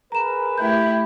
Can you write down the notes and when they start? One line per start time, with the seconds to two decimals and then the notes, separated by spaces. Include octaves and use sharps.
0.12 G#4 A#4 B4 A#5 E7
0.58 A3 E4 G4 G6